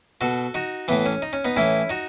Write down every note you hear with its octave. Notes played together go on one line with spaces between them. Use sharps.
B2 F#4 A4
D#4 F#4
A2 E3 B3
C#4
D#4
C#4
B3 D#4
A2 E3 C#4 E4
D#4 F#4